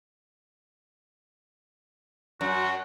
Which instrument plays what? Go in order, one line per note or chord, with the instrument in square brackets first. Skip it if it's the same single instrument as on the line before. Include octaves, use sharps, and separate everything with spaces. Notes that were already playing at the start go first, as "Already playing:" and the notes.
[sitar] F#2 [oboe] F#4